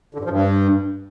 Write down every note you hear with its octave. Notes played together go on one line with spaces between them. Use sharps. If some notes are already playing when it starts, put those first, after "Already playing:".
D3
G2
F3
G2